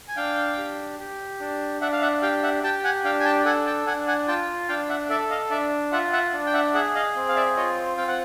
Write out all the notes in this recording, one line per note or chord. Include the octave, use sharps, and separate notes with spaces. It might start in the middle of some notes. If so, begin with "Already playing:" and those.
G#5
D4 F5 G5
G4
G4
D4
D4 E5 F#5
F5
E5 F#5
G4 F5 G5
E5 F#5
G4 G5 A5
F#5 G#5
D4 F5 G5
G#5
G5 A5
A4 F#5 G#5
G5 A5
D4 F#5 G#5
F#5 G#5
F4 G5 A5
D4 F5 G5
E5 F#5
A4 D5 E5
D#5 F5
D4 D5 E5
F4 E5 F#5
E5 F#5
D4
G5
E5 F#5
G#4 E5 F#5
D#5 F5
C4
F5
D5 E5
F4 C#5 D#5
C4 F5 G5
F#5